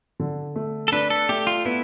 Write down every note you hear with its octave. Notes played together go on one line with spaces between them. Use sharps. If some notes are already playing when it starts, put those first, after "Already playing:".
D3
A3
A4
D4 B4
A4
A3 G4
F4
B3 E4